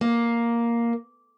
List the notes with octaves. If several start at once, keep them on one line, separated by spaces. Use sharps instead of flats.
A#3